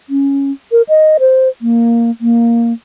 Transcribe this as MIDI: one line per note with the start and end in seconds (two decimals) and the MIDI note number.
0.10 0.52 61
0.72 0.82 70
0.89 1.17 75
1.20 1.48 72
1.61 2.11 58
2.21 2.73 58